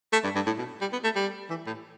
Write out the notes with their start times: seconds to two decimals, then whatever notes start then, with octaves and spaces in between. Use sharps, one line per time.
0.13 A3
0.24 G2
0.35 G2
0.46 A2
0.59 B2
0.81 G3
0.92 B3
1.04 A3
1.16 G3
1.50 E3
1.67 A2